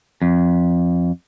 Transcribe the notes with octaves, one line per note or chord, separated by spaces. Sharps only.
F2